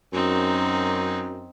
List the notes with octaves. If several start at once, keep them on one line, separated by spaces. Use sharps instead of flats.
F#2 C4 D#4